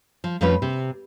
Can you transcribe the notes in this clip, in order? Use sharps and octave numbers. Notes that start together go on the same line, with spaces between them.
F3
F2 F3 A3 C#4 F4 B4
C3